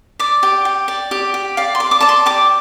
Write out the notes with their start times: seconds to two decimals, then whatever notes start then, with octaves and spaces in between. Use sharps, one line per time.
0.19 D5 D6
0.43 G4
0.65 G4
0.88 D5
1.11 G4
1.34 G4
1.57 D5 F5
1.75 C6
1.80 D5
1.91 D6
2.01 D5 A5
2.09 C6
2.26 G4 D6